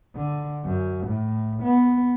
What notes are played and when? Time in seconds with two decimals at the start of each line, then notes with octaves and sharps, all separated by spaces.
0.16 D3
0.64 F#2
1.07 A2
1.63 B3